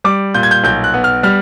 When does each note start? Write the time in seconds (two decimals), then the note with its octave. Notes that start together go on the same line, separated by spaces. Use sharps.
0.04 G3 D6
0.34 A#2 G6
0.43 G#6
0.51 G6
0.64 B1 G6
0.84 F#6
0.94 B3
1.04 F6
1.23 G3 F6